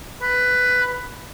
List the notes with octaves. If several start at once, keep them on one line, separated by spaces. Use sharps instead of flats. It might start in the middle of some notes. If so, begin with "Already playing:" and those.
B4